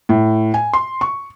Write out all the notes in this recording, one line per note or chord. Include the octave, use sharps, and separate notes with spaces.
A2
G#5
C6
C#6